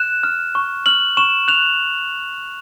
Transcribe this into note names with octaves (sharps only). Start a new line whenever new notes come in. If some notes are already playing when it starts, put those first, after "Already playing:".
Already playing: F#6 E7
F6
C#6
F6 F#7
C#6 E7
F#6 F7